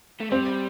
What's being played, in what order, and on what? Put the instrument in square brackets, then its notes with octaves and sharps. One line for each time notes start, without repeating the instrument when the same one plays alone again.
[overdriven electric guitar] A3
[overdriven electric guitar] G3 [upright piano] C4